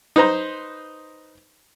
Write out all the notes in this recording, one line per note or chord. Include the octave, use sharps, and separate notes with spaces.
D#4 B4 C5 A#5 B5